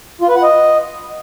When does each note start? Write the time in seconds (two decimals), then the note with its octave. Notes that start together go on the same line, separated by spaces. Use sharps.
0.21 F4
0.28 B4
0.36 F#5
0.43 D#5